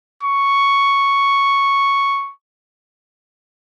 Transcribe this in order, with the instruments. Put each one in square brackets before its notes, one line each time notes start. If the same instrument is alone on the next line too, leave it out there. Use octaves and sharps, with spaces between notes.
[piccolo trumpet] C#6